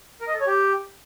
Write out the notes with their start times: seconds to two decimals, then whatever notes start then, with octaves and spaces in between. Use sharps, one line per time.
0.21 A#4
0.27 D#5
0.34 A4
0.40 C#5
0.47 G4